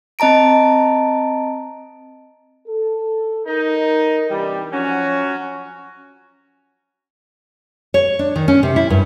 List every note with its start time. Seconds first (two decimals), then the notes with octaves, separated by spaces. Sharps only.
0.19 C4 D#5 A5 A#5 D7
2.67 A4
3.47 D#4 A#4
4.30 C3 E3 G3 D4
4.72 F3 F#3 C#4 F#4
7.94 C#5
8.19 D4
8.36 D#3
8.48 C#4
8.63 C3
8.76 E4
8.90 G2